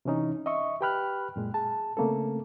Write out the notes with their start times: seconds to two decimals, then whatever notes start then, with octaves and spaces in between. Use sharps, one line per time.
0.05 C3 E3 C#4 D#4
0.46 D#5 E5 C#6
0.81 G4 B4 G5 B5 F6 F#6
1.36 F#2 A#2 G#3
1.54 G#4 A5
1.97 C#3 A3 A#3 C4 A4